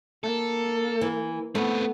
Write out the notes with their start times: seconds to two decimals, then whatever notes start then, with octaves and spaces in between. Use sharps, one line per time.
0.24 A#3 A4
1.01 E3
1.55 A3 B3 C4 B4